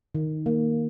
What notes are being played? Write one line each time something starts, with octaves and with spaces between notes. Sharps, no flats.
D#3
A#3